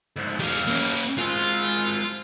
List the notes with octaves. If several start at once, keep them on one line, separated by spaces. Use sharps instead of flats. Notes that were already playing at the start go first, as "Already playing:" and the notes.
D2 G#2
E2 G#3 G4 F5
A#3 C#4
G#3 C4 F4